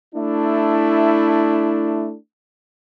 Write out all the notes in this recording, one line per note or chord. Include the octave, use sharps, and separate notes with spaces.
A3 D4 E4